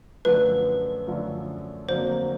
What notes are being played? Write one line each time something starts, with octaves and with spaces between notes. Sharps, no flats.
F#2 D3 F3 A3 B4
F#2 D3 F3 A3
F2 D3 F#3 A#3 C5